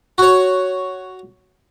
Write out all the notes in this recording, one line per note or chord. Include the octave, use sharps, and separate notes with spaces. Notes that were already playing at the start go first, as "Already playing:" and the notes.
F#4 C#5